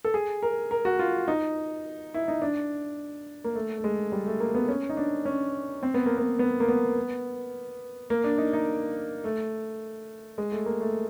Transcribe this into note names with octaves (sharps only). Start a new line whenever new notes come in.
A4
G#4
A#4
A#4
F#4
F4
D#4
E4
D#4
D4
A#3
A3
A3
G#3
G3
A3
A#3
B3
C#4
D#4
D4
C#4
C4
B3
A#3
B3
B3
A#3
B3
A#3
D4
D#4
D#4
A3
G#3
A3
A#3
A3